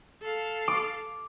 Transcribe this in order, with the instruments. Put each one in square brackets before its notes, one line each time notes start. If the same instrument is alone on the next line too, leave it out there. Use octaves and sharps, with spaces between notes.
[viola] A4 F5
[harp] D6